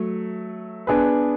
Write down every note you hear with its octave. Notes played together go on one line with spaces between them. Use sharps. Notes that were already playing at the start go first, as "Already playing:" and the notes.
Already playing: F#3 A3
B3 D4 G#4 B4